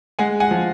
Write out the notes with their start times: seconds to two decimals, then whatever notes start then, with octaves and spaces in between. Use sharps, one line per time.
0.19 G#3 F#5 G#5
0.40 F#5 G#5
0.51 F3